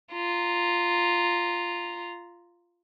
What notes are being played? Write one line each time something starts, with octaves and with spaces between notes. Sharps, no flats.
F4 A#5